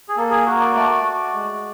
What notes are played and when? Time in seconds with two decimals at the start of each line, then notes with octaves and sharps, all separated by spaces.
0.08 G#4
0.17 A#3 A4
0.30 G#4
0.46 F#4 A#4
0.60 D5
0.75 A3 D5
1.03 F#4
1.33 G#3